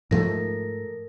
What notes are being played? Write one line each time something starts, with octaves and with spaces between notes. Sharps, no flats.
G#2 F3 A3 A4 A#4 A#6